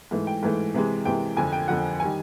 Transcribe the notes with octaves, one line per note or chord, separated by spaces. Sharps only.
G#2 E3 A3
G5
G#2 E3 A3
C3 E3 G#3
C3 E3 G#3 G5
F2 D3 F3 G#5
G5
F2 D3 F3 F#5
D#3 G3 G#5